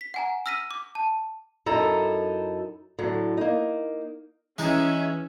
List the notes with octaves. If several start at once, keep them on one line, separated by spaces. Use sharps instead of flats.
B6
F#5 G#5 A#5
E6 F6 A#6 B6 D#7
D6
A5
F#2 D#4 E4 A4 A#5
A2 D3 F#3
A#3 D#4
E3 G#3 C#4 D#4 G#4 E5